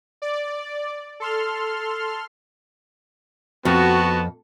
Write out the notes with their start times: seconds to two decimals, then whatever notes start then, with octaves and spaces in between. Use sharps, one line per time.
0.22 D5
1.20 A4 C6 F6
3.65 F2 B3 F#4 A5